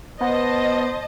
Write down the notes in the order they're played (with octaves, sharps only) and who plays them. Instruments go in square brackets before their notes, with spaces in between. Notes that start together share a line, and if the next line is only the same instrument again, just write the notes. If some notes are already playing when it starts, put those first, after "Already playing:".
[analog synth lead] B3 [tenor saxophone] C5 [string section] D#5 A5